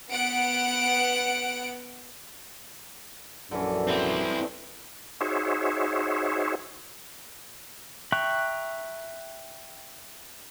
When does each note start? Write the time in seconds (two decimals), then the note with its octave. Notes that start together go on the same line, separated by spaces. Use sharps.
0.11 B3 F#5 D7
3.51 A#1 F#2 D3 E3 C#4
3.87 C4 E4
5.21 D#4 F#4 G#4 C5 C#5 E5
8.12 E5 G5 A#5 C#6 F#6